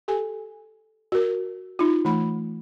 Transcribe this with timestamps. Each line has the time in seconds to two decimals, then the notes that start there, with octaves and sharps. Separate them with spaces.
0.08 G4 A4 G#5
1.12 F#4 A#4
1.79 D#4 F4
2.05 E3 A3 B5